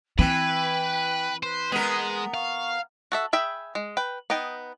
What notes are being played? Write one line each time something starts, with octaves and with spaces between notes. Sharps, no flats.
E3 C4 B4 G5
B4 C5
G#3 B3 A#4
F5 C#6
F#4 A4 E5
G#4 E5 G5 B5
G#3
B4 G5
B3 D#4 D#5 G5